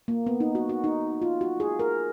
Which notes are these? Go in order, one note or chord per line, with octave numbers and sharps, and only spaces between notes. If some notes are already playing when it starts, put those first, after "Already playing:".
A#3
B3
D#4
F#4
F#4
D#4
F4
F#4
G#4
A#4